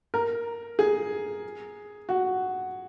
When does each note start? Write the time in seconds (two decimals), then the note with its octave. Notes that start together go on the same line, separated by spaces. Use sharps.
0.14 A#4
0.79 G#4
2.09 F#4